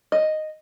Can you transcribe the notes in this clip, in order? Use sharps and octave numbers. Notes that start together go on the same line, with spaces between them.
D#5